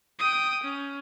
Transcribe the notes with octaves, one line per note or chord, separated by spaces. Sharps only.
G5 D#6
C#4